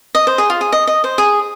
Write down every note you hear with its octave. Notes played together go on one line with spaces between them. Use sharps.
D#5
C5
G#4
F4
G#4
D#5
D#5
C5
G#4